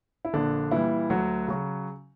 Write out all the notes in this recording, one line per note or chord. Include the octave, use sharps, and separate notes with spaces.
E4
A#1 D3 D4
A#2 E3 G3 E4
D2 F#3 F#4
C#3 F#3